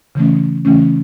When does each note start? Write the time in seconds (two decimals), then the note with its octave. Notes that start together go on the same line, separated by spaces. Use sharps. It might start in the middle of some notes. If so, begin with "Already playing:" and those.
0.15 C#3 E3 A3 C#4
0.65 C#3 E3 A3 C#4